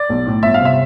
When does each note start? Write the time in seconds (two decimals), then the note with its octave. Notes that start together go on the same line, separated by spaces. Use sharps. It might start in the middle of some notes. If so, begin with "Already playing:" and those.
Already playing: D5
0.10 B1
0.27 A2
0.43 G1 E5
0.54 F5
0.60 C3 E5